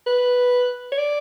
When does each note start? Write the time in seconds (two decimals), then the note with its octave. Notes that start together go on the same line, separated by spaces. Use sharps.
0.07 B4
0.92 C#5
0.98 D5